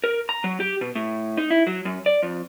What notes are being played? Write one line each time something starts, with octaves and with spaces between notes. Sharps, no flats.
A#4
A#5
F#3
G4
B2
A2
D#4
E4
F#3
F#2
D5
F2